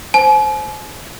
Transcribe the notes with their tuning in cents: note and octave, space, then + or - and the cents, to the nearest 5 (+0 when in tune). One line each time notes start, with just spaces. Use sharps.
C5 +0 G#5 +45